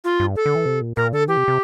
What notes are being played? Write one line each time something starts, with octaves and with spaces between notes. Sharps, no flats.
F4
G2
A4
D3
E3
C3
A#2
A#2 A#4
D3 A4
E3 G4
C3
C3